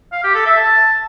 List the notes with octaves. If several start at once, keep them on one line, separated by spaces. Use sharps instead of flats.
F5
G4
A4
E5
A5